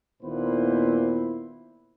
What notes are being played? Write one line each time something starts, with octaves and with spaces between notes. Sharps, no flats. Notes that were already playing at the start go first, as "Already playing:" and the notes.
D#2 A#2 B3 E4 B4 C5